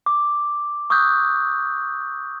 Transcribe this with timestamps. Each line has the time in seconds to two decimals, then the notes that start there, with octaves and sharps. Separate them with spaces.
0.06 D6
0.90 C#6 D#6 E6 F#6 G6